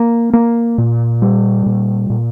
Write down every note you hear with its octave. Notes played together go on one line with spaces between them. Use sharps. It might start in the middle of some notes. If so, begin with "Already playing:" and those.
Already playing: A#3
A#3
A#2
G3
A#2
A#2